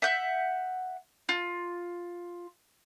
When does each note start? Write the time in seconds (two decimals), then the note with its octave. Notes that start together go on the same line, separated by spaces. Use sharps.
0.02 E5 F#5 G6
1.29 F4